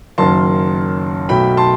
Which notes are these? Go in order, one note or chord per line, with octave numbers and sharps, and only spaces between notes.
F#1 F#2 D#3 A5 C6
B1 B2 A3 G5 B5
A5 C6